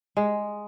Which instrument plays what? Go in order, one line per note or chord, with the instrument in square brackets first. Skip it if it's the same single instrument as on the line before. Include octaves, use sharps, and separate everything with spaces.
[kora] G#3